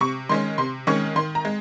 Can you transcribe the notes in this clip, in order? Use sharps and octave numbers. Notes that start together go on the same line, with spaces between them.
C3 C#6
D#3 G#3 C#4 C6
C3 C6
D#3 G#3 C#4 C#6
D#3 C6
A#5
G#3